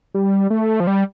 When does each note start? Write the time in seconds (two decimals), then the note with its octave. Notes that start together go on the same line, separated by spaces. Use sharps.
0.15 G3
0.50 A3
0.80 F3
0.87 G3